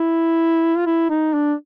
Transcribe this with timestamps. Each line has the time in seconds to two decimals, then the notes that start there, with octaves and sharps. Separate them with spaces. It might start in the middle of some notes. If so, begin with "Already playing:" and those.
Already playing: E4
0.77 F4
0.86 E4
1.10 D#4
1.34 D4